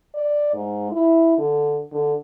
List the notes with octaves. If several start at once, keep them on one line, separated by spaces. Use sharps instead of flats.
D5
G#2
E4
D3
D3